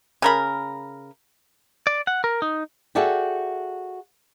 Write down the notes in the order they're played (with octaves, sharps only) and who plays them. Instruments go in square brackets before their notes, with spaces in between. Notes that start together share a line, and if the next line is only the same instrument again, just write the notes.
[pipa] C#3 A#4 B5
[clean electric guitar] D5
F#5
A#4
D#4
[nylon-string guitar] F#4 G#4 A4 D5 E5 G5